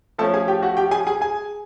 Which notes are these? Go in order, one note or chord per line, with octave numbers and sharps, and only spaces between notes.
F3 A3 C#4 A4 A5
G#4 G#5
G4 G5
F#4 F#5
G4 G5
G#4 G#5
G#4 G#5
G#4 G#5